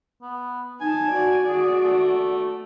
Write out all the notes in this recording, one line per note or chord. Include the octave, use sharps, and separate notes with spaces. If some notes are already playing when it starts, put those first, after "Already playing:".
B3
D#4 G#5 A5
F#4 D5
G#4
A3